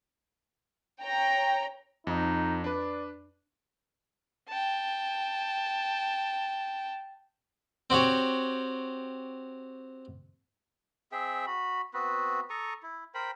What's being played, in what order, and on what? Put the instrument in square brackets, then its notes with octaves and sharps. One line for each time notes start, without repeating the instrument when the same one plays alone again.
[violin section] C#5 G5 A#5
[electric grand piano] F2 [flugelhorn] D#4
[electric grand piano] D4 B4 [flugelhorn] D5
[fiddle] G5 A5
[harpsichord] C4 F#4 G4 C#5
[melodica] C4 G#4 E5 G5
F#4 B5
B3 C4 F#4 B4
A4 A#5 C#6 D#6
E4
A#4 C5 G5 B5